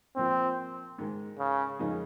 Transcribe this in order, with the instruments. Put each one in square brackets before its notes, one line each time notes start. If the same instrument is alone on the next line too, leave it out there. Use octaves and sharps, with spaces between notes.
[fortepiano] A#2 F3 A#3 [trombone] C4
[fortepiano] G#2 D#3 G#3
[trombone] C#3
[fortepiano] F2 C#3 G#3 D#4 A#4